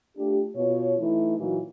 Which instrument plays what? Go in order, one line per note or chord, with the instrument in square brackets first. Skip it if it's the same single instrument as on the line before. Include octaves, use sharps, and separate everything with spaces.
[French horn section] A3 D4 F4 G4
B2 F4 C#5
E3 A3 D#4 E4
A#2 E3 F#3 D#4 F4 F#4